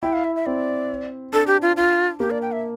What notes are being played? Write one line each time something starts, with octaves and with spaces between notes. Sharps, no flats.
E4 G5
F5
E5
E5
C4 D5
D4 A4
G4
F4
F4
A#3 G4
D5
G5
E5